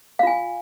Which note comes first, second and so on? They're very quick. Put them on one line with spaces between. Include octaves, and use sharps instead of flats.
F5 F4 G#5